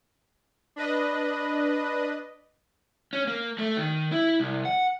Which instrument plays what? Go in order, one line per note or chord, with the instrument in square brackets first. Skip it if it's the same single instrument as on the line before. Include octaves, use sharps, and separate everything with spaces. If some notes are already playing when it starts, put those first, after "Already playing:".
[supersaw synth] D4 B4 D#5
[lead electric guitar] C#4
A#3
A3
D#3
E4
C2
F#5